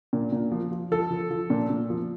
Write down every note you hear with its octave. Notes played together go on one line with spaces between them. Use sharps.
A#2
A#2
F3
F3
F3 A4
F3
F3
A#2
A#2
F3